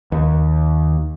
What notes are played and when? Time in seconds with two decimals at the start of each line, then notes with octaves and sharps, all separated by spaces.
0.12 D#2